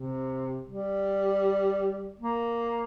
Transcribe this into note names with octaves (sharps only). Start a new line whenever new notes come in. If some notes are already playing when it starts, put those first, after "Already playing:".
Already playing: C3
G3
A#3